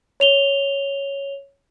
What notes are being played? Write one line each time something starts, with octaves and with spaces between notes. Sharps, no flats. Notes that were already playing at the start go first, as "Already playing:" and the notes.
C#5 F7 G7